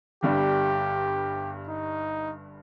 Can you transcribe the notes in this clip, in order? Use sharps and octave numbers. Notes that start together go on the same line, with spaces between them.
G1 G2 G3 G4
D#4